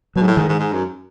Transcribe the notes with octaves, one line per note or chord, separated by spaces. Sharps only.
B2 F#3
G#2
A2
G#2 D#3
G#2
G#2
F#2